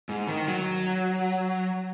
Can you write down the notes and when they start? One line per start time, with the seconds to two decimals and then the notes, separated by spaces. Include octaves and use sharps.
0.09 G#2
0.27 D#3
0.48 F#3